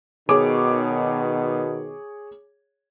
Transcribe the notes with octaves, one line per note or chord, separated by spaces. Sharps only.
B2 D#3 G#4 C#5 D6